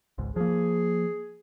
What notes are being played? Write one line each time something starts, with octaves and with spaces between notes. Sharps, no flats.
G#1 C#2 G#2
F3 A#3 G#4